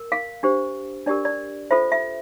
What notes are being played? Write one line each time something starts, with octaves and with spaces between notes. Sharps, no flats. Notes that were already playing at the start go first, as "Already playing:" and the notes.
Already playing: A#4
F5
D4 G4 C5
D4 G4 A#4 D5
D5
F4 A4 C5 E5
E5